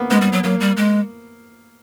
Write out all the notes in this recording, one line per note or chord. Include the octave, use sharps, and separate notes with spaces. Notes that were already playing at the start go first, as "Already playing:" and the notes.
Already playing: A#3 B3
G#3 B3
G3
F#3
F#3 A#3
G3
G#3